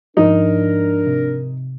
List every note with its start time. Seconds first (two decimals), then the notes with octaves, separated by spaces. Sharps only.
0.17 G#2 F3 D4 D#4 A#4
1.07 C3